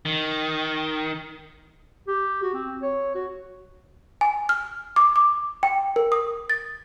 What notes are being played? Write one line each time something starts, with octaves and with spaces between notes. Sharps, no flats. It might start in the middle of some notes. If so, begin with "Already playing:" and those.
D#3
G4
F#4
C4
C#5
F#4
G#5
F6
D6
D6
G5
A#4
D#6
A6